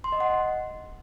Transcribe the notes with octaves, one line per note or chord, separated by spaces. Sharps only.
C6
D#5
F#5